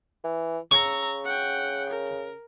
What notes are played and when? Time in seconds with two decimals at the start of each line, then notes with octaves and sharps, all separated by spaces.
0.24 E3
0.71 C#3 A#5 C#6 E6
1.25 F#5 G5
1.89 A#4